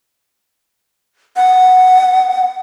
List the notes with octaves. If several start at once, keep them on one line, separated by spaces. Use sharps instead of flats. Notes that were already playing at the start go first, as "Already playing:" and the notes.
F#5